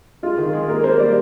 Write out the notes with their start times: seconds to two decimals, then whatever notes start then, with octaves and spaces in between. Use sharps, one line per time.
0.23 G#3 F4
0.38 D#3
0.53 G#3 G#4
0.69 A#3 A#4
0.84 A#3 C5
0.99 G3 D5